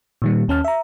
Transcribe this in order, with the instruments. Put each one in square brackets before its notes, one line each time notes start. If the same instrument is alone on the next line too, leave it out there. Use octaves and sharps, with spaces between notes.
[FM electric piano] A#2 D#3 G3
D#2 C#4 A5 F6
E5 A#5